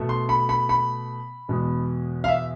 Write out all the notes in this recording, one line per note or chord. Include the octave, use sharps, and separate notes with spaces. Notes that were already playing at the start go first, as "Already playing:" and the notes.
Already playing: B2 A3
C6
B5
B5
B5
E2 B2 G#3
F5
E5